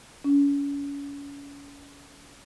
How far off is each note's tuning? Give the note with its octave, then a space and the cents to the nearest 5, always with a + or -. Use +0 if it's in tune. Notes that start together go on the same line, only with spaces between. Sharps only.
C#4 +35